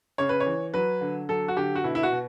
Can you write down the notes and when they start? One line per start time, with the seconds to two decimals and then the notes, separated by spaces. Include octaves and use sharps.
0.18 C#3 C#5
0.29 B4
0.40 C#5
0.46 E3
0.74 F#3 B4
1.01 D3
1.29 F#3 A4
1.48 F#4
1.56 D3 G4
1.75 F#4
1.84 B2 E4
1.95 E4
2.03 F#4
2.12 B2